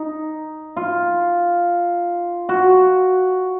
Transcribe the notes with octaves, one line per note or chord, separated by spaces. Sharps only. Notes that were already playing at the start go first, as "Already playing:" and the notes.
Already playing: D#4
F4
F#4